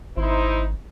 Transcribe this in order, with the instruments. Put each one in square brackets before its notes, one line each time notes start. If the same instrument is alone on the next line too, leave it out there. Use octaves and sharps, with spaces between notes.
[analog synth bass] G#1 [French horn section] D#4 E4 C5